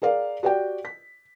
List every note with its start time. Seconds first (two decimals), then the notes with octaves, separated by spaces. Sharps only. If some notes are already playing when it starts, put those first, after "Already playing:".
0.02 G#4 A#4 D5 F5
0.43 F#4 G4 D5 F#5 G5
0.85 B6